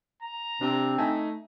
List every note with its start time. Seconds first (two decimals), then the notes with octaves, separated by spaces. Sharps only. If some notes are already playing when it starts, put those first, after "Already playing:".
0.22 A#5
0.61 C3 C4 D4
0.98 A3 D#4 G#5